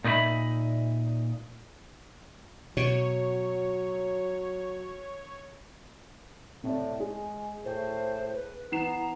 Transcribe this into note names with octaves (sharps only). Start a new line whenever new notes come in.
A#2 D#4 B4 E5 B5
B2 F#3 C#5
A2 C3 D5
G#3 G#4
A2 C5
B4
E3 B3 A#5 C7 E7